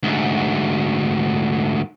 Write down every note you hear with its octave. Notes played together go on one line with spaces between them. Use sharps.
D2 G#2